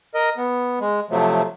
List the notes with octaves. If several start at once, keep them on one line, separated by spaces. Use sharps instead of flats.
A#4 D#5
B3
G#3
C3 F3 F#3 A3